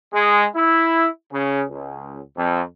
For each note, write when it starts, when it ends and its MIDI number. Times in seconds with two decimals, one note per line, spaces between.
0.13 0.45 56
0.55 1.07 64
1.32 1.63 49
1.69 2.18 37
2.36 2.62 41